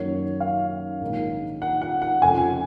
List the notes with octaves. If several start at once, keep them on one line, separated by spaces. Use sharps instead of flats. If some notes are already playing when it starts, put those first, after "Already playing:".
Already playing: F#2 D#3 F#3 A#3 C#5
F5
A#1 G#2 D#3 A#3
F#5
F#5
F#5
F1 F2 C#3 F3 G#5